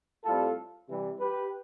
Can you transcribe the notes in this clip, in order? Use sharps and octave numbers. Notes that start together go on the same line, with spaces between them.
A2 G3 C4 F4 A4
C3 E3 G3
G4 B4